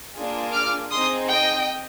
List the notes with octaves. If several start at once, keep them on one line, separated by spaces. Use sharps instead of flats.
A#3 D4 F4 G#4
D6 F6
C4 D#4 G#4 C6 D#6
D#5 G5